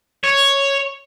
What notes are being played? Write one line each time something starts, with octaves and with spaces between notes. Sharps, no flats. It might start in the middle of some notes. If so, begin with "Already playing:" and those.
C#5